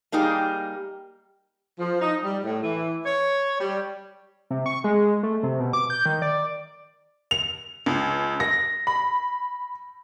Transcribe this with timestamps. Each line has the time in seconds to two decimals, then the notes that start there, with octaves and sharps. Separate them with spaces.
0.12 G3 A#3 D#4 G4 G#4
1.80 F3
2.01 D#4
2.24 G3
2.45 A2
2.63 E3
3.06 C#5
3.60 G3
4.50 C3
4.66 C#6
4.84 G#3
5.23 A3
5.43 C3
5.60 B2
5.73 D6
5.90 G6
6.06 D#3
6.22 D5
7.31 F7
7.86 C#2
8.40 A#6
8.87 B5